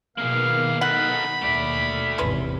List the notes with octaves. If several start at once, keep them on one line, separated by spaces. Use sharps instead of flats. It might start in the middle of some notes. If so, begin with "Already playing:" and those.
B2 D#3 A#3 B3 G#4 F5
D#4 A4 F#5 B5
D#2 B2 A3 D5
G#1 E2 C3 C#4 B4